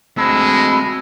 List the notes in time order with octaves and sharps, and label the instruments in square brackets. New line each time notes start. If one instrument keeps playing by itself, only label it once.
[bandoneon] D2 E6 [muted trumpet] G#3 [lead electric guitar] C4 A5 [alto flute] B5